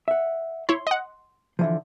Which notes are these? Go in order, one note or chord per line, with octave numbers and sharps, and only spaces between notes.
E5 F#5
E4 C#5 C6
D#5 F#5
D3 E3 F3